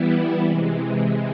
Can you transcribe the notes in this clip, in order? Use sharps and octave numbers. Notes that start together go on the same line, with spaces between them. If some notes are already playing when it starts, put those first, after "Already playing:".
Already playing: E3 G3 B3 E4
C3 E3 G#3